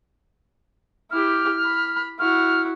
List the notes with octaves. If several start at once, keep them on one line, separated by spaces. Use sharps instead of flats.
E4 G4 F6
B5
E4 F#4 F6